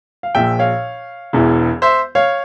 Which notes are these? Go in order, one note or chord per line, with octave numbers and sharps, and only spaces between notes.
F5
A#1 A#2 F3 E5 G5
C#5 F5
E1 E2 E3
C5 E5
C#5 F5